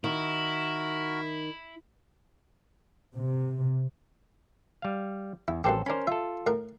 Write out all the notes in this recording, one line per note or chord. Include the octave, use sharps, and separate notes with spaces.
D#3 E4 F#4 A#4
C3
G3 F5
E2 E4
A1 F#2 C4 G4 A4 C5
C#4 D4 A#4 C5 B5
F4 A4 E5
A2 A#4 F#5